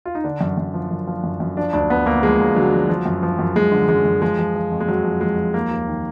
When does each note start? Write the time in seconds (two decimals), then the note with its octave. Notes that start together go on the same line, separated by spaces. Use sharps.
0.05 F4
0.15 D#4
0.24 D3 D4
0.41 F#2
0.58 F#2
0.74 F3
0.91 F#2
1.07 F3
1.24 F#2
1.40 F#2
1.57 F3 D4
1.73 D2 D4
1.90 D2 B3
2.06 D2 A#3
2.23 F3 G#3
2.39 D2
2.56 D3 F#3
2.72 F3
2.89 F3
3.06 F#2
3.23 F3
3.39 F#2
3.56 F#2 G#3
3.72 D3
3.89 F#2 G#3
4.05 F#2
4.22 F3 G#3
4.39 F3
4.55 F3
4.71 F2
4.81 G#3
4.88 F2 F#3
5.05 F3
5.21 F2 G#3
5.37 F3
5.54 D#2 A#3
5.71 D#2
5.88 D#3